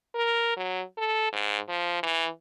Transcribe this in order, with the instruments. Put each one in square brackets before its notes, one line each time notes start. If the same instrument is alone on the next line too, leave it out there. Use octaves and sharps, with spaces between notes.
[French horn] A#4
F#3
A4
G#2
F3
E3